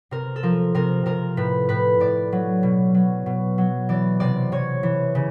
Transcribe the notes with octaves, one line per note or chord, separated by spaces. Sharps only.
C3 A#4
A4
F3 A#4
C3 A#4
C3 A#4
A2 B4
A2 B4
A2 D5
F#3
B2
F#3
B2
F#3
E3 D5
C3 D5
C3 C#5
E3
C#3